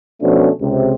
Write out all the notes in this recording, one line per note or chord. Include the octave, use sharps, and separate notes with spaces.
B2 F3 A3 C#4 D4
C#2 C3